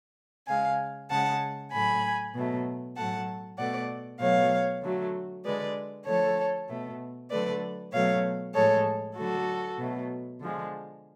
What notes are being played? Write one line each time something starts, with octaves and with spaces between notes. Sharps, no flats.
C#3 G#3 F5 G#5
C#3 G#3 F#5 A5
A2 F#3 A3 G#5 B5
B2 F#3 A3
A2 F#3 A3 F#5 A5
B2 A3 D5 F#5
B2 F#3 A3 C#5 F5
D3 F#3 A3
D3 G#3 B4 D5
D3 F3 A3 A4 C#5
B2 A3
D3 F#3 A3 B4 D5
B2 F#3 A3 C#5 F5
A2 F3 G#3 A4 C#5
D3 F#3 A3 F#4 A4
B2 F#3 A3
D3 F3 G#3